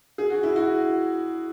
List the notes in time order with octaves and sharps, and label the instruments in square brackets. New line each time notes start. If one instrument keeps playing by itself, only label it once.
[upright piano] G#4
F#4
E4
F#4